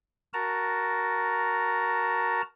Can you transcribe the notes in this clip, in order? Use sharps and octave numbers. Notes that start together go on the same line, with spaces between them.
F#4 A#4 A5 A#5